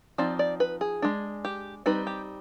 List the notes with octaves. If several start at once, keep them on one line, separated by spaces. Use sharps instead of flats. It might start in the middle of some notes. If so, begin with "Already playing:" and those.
F3 C4 D#4 D5
D5
B4
G#4
G#3 D4
G4
G3 C4 D#4 B4
G4